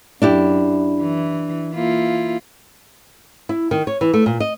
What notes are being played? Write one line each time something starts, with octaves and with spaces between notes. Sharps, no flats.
F#2 D4 E4 G4
E3
A#3 E4 F4
E4
D#3
C#5
E3
A3
A#2
D#5